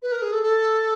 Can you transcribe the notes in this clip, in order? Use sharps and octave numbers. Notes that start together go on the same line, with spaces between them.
B4
A#4
G#4
A4
A4